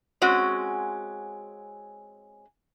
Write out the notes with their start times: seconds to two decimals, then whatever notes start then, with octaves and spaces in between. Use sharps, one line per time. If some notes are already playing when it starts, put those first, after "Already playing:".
0.22 G#3 C4 C#4 F#4